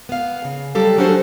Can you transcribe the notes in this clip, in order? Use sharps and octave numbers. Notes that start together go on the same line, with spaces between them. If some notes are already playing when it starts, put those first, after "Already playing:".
B3 F5
C#3
F#3 G3 G4 A4 F5
F#3 C#4 D4 F#4 A4 C5